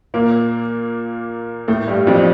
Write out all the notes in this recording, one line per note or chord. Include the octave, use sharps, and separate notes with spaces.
A#2 A#3
A2 A3
G2 G3
F2 F3